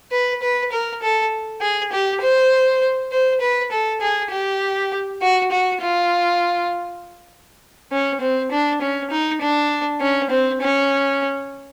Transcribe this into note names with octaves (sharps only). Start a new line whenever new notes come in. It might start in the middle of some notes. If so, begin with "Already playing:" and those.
B4
B4
A#4
A4
G#4
G4
C5
C5
B4
A4
G#4
G4
F#4
F#4
F4
C#4
C4
D4
C#4
D#4
D4
C#4
C4
C#4